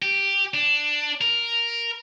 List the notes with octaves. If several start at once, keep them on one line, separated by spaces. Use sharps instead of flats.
G4
D4
A#4